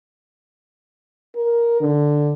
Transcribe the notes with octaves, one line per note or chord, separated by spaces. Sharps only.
A#4
D3